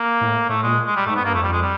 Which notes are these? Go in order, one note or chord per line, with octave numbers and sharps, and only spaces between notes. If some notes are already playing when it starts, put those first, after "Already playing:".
Already playing: A#3
A2
A2 A3
A#2 G#3
G#3
G3
G#2 A3
G2 B3
A#3
F2 A3
G3
F2 G#3
G3